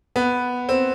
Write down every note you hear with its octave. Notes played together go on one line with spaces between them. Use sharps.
B3
C4